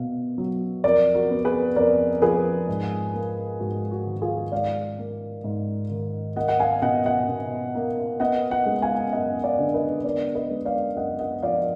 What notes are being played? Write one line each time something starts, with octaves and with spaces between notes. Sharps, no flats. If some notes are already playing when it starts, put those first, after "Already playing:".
Already playing: B2 B3 F5
F#3
F2 A#4 D5
F#4 A#4
B3
G#4 B4
F2 A#4 D5
F3 G#4 B4
G#2
A#3
G#2 F#4
F#4
D#3
F4 G#4
G#2 D5 F5
A#3
G#2
D#3
A#3 D#5 F#5
F#5
F5 G#5
B2 D#5 F#5
D#5 F#5
B2
A#3
B3 D#5 F#5
D#5 F#5
G#3
F5 G#5
F#2 D#5 F#5
D5 F5
D3
B4 D#5
B3 A#4 D5
B4 D#5
G#3
D5 F5
F#2 D#5 F#5
D#5 F#5
F3 D5 F5